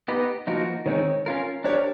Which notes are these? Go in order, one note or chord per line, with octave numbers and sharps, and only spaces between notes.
B3 D#4 G4 B4 D#5
F3 A#3 D#4 F#4 A#4
D#3 G#3 C4 D#4 C#5
C#4 F4 A#4
D4 G4 A#4 C#5